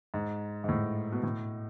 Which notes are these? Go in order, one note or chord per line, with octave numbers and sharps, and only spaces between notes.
G#2
G#2
A2
B2
A2